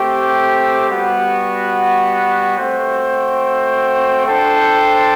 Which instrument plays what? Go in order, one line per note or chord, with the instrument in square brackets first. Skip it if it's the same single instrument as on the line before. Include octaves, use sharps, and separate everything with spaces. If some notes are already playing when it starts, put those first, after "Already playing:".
Already playing: [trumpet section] A3 C4 G4
G3 B3 F#4
A3 C4 F#4 C5 G5
D4 A4 C5 G5